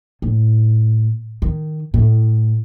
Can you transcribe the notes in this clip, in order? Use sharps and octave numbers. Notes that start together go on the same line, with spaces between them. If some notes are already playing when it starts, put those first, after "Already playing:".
A2
D#3
A2